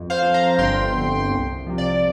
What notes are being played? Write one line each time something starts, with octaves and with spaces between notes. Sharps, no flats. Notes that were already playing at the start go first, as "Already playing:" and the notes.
Already playing: F2
C5 F5
F3
F5 A#5
G1 G5 C6
F2 D3
C2
C3 F3
D5